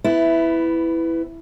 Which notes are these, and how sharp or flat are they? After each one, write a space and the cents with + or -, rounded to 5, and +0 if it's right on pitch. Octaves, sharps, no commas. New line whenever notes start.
B3 +20 E4 +0